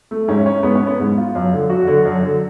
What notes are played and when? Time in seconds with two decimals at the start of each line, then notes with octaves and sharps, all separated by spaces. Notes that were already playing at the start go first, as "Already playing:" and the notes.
0.11 A3
0.28 G#2 C#4
0.46 C#4
0.63 G#2 B3
0.75 C#4
0.87 B3
1.00 G#2
1.18 F4
1.35 F#2
1.53 D3
1.70 F#2 F#4
1.87 D3
2.05 F#2
2.23 D3